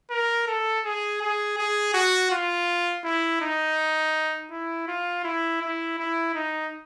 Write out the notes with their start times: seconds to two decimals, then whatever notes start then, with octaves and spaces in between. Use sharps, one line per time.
0.10 A#4
0.47 A4
0.85 G#4
1.22 G#4
1.58 G#4
1.94 F#4
2.31 F4
3.04 E4
3.42 D#4
4.51 E4
4.88 F4
5.24 E4
5.62 E4
5.99 E4
6.34 D#4